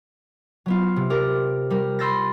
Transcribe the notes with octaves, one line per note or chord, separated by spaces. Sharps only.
F#3 B3 F4
C3
G4 A#4 D5
G3 A#4
B5 C6 E6 G6 A6 A#6